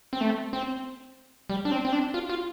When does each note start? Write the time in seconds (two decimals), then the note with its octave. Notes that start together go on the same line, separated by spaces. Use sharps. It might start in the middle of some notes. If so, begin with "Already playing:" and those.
0.13 C4
0.21 A3
0.53 C4
1.50 G3
1.65 D4
1.72 C4
1.85 C4
1.93 D4
2.14 F4
2.30 F4